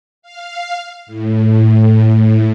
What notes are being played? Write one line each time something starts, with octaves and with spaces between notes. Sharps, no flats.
F5
A2